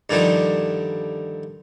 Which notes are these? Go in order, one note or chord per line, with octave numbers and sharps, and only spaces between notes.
G2 D3 D#3 F3